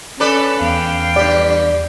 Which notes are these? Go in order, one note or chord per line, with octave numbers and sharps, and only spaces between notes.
C#4 A4 B4 D5
E2 F5 G5
G2 G4 D5